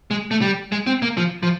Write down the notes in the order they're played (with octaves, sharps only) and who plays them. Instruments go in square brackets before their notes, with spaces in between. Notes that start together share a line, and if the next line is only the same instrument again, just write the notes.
[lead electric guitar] G#3
A3
G3
G#3
C4
A#3
F3
F3